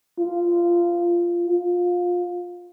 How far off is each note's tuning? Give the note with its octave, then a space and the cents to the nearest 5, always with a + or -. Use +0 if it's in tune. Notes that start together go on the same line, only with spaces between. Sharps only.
F4 -15
F4 +20